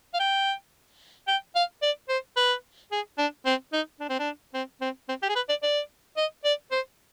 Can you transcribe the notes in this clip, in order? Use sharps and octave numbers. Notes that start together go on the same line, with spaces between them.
F5
G5
G5
F5
D5
C5
B4
G#4
D4
C4
D#4
D4
C4
D4
C4
C4
C4
G4
G#4
B4
D5
D5
D#5
D5
C5